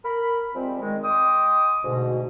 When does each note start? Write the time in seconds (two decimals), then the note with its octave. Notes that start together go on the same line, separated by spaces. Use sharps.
0.04 A#4 B5
0.54 F3 G3 G#3 C4
0.81 D#3 G#3
1.04 D#5 G5 C6 D6 D#6
1.84 D2 G#2 B2